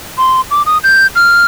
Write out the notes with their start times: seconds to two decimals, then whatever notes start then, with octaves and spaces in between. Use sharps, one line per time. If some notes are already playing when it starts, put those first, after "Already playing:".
0.18 C6
0.51 D6
0.66 D#6
0.84 G6
1.16 F6